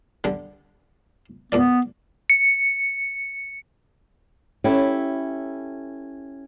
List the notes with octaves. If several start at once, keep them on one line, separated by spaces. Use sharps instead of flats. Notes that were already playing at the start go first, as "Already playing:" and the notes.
D3 G3
E2 A#2 B3 D5
C#7
C#4 E4 G4 A4